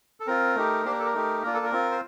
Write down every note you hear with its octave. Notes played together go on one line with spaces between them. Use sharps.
A4
C4 F4 A#4
A3 D#4 G4
A#3 D4 G4 C5
A#4
A4
A#4
A3 D#4 G4
A#3 D4 F4 A#4
A4
A#4
C4 F4
C5